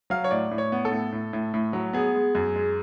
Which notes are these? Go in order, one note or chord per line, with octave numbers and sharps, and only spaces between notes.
F#3 F5
C#5
A2 D5
A2
C#5
B3
A4
A2
A2
A2
A2
F#3
B3 G#4
G#3
F#2
G#3